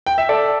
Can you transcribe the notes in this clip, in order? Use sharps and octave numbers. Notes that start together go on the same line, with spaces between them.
G5
E5
A4 D5